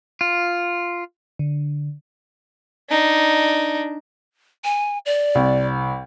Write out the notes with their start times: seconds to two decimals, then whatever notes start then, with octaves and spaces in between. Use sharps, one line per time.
0.21 F4
1.39 D3
2.89 D4 D#4
4.64 G#5
5.06 D5
5.35 C2